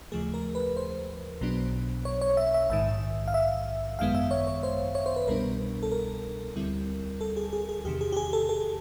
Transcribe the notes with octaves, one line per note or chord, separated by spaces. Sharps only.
D#2 C#3 F3 A3 G#4
A#4
B4
C5
B1 B2 F#3 B3 D4
C#5
C#5
E5
E5
A#1 G#2 D#3 E5
F5
E5
G#1 F#2 D#3 G#3 B3 F5
E5
C#5
C#5
C5
C#5
C5
B4
C2 B2 G3 B3 D4 A#4
A4
A#4
D2 D3 G3 C4 E4
A4
G#4
G#4
G#4
E2 C3 D#3 G4
G#4
G4
G#4
A4
A4